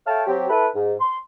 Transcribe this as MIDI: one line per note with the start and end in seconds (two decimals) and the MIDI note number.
0.06 0.22 69
0.06 0.22 73
0.06 0.22 76
0.06 0.22 77
0.06 0.22 79
0.06 0.22 81
0.26 0.48 54
0.26 0.48 60
0.26 0.48 67
0.49 0.67 64
0.49 0.67 69
0.49 0.67 71
0.75 0.92 44
0.99 1.16 84